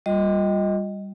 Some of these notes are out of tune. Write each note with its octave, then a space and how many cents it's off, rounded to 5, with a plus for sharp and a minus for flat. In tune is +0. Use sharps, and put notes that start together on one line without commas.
G3 +0 F4 +30 D#5 +10